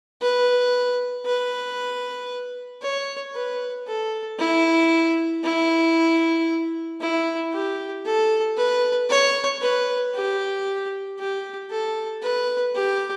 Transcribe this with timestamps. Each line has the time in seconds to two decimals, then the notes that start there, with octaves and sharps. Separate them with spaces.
0.21 B4
1.26 B4
2.82 C#5
3.34 B4
3.87 A4
4.39 E4
5.44 E4
7.00 E4
7.53 G4
8.05 A4
8.57 B4
9.09 C#5
9.61 B4
10.14 G4
11.19 G4
11.71 A4
12.22 B4
12.75 G4